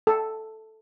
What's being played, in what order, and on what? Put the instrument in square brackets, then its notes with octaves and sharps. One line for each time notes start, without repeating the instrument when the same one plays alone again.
[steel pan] A4